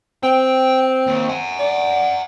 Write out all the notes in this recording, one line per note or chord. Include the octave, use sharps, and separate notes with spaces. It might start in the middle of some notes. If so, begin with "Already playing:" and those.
C4 G5
D#2
F#5 G#5
D5